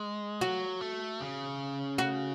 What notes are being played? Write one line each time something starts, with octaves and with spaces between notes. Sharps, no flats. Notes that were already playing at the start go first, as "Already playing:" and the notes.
Already playing: G#3
F#3 F#4
A3
C#3
F#4